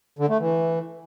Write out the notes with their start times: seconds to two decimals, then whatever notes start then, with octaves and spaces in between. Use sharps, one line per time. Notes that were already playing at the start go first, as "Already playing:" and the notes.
0.19 D3
0.29 A3
0.40 E3